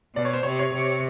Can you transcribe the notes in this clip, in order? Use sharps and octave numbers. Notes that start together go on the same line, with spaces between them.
B2 D5
C#5
C5
C3 C#5
C#5
C3